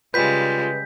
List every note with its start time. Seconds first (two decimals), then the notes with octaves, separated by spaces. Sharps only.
0.14 C#3 G3 G#3 F4 B4 G6 B6